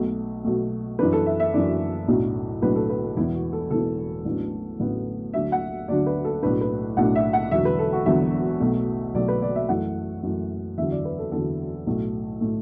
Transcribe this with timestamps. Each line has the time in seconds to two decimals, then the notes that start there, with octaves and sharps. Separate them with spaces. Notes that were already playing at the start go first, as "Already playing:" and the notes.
Already playing: B1 B2 A3
0.44 B1 B2 A3
0.99 F#2 E3 D4 B4
1.13 A4
1.26 E5
1.40 E5
1.54 F#2 E3 D4 D5
2.08 B1 A2 F#3 D4
2.62 B1 A2 F#3 D4 B4
2.76 A4
2.89 B4
3.03 A4
3.17 E1 E2 E3 B3 E4
3.34 F#4
3.53 A4
3.70 E1 E2 E3 B3 A4
4.25 A1 A2 F#3 B3 D4
4.80 A1 A2 F#3 B3 D4
5.34 D2 D3 F#3 D4 E5
5.52 F#5
5.88 D2 D3 F#3 D4 D5
6.06 B4
6.25 A4
6.43 B1 A2 A3 D4 B4
6.61 B4
6.97 B1 A2 A3 D4 F#5
7.15 E5
7.33 F#5
7.51 E1 E2 D3 F#3 E5
7.65 B4
7.79 A4
7.93 F#4
8.06 E1 E2 D3 F#3 E5
8.60 B1 B2 F#3 A3
9.14 B1 B2 F#3 A3 D5
9.28 B4
9.42 D5
9.56 E5
9.69 F#2 E3 A3 F#5
10.23 F#2 E3 A3
10.78 E2 D3 F#3 E5
10.91 D5
11.05 B4
11.19 A4
11.32 E2 D3 F#3 A4
11.87 B1 A2 A3
12.41 A2 A3